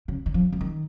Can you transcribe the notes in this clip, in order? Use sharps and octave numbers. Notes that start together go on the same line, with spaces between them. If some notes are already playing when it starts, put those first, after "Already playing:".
C#3
D#3
F3
F3
D#3